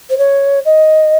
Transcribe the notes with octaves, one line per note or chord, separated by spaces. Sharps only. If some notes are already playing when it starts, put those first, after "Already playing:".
C5
C#5
D#5